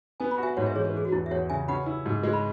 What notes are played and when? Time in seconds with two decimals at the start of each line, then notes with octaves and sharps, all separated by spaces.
0.20 B3 G#5
0.31 B5
0.38 F#4
0.43 E5 G#5
0.57 G#2 C#5 F#5
0.66 B4 E5
0.75 E3 G#4 C#5
0.85 B4
0.94 E3 G#4
1.05 F#4
1.12 E2 E4
1.26 E5
1.31 E2 C#5 F#5
1.50 C#3 E5 G#5
1.68 C#4 F#5 B5
1.86 E4
2.06 G#2
2.23 G#3
2.33 B5